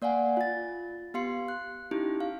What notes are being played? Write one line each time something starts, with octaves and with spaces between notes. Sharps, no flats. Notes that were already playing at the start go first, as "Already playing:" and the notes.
A#3 D5 F5 F#5 G#5
F4 A6
B3 G4 F5 C6 C7 C#7
F#6
C#4 D#4 E4 G4
F5